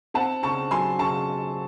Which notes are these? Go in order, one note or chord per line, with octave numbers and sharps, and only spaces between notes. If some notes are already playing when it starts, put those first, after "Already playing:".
C4 F#5 A5
C#3 A5 C#6
F#3 G#5 C6
C#3 A5 C#6